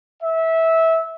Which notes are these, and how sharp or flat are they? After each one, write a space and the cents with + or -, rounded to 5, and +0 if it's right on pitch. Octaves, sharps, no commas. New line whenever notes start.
E5 -20